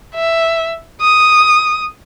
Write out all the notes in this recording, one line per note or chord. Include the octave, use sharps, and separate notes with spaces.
E5
D#6